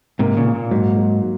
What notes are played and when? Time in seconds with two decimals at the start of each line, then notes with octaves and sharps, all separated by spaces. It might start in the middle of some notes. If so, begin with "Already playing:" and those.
0.19 G#2 C3 A#3
0.37 A#2 C#3
0.46 A#3
0.55 A#2
0.71 G#2 F#3
0.97 F#3